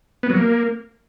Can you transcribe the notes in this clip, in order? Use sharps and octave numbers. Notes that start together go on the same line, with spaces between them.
B3
F#3
A#3